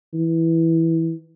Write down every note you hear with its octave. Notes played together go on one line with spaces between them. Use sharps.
E3